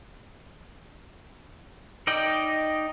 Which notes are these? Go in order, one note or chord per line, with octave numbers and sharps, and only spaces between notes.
D#4 D5 D#5 G5